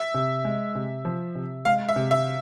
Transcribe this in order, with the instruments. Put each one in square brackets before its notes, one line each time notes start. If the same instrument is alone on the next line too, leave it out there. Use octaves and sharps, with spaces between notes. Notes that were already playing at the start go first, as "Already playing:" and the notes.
Already playing: [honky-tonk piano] E5
[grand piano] C3
G#3
C3
F3
C3
[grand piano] G#3 [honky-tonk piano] F5
[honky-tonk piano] E5
[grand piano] C3
[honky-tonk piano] E5